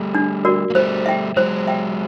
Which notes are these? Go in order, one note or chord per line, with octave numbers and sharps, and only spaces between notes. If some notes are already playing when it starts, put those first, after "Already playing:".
Already playing: G3 A3
D4
F#4 A#4 D5
A#3
G3 A3 C5
E5 G5
F#3 G#3 C5
E5 G5